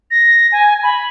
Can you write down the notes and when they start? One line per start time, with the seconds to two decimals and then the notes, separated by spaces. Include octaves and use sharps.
0.11 A#6
0.52 G#5
0.83 B5